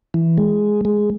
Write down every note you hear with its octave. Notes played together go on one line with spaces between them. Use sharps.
E3
G#3
G#3